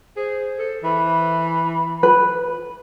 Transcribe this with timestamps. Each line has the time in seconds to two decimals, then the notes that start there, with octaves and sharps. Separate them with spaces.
0.16 G#4 C5
0.58 A4
0.83 E3 B5
2.03 B4